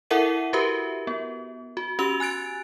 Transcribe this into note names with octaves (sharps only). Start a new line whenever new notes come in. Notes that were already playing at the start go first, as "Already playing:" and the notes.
E4 A4 A#4 E5 F#5 D#7
F#4 G4 A#4 B4 E5
B3
F#4
C#4 F#4 G4 E6 F7
G#5 F#6 A6 D7